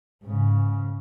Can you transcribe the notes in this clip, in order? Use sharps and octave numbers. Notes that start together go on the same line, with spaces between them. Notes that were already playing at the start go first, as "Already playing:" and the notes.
G#2 C#3